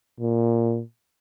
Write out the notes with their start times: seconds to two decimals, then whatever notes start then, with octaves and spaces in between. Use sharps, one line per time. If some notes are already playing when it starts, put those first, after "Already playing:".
0.20 A#2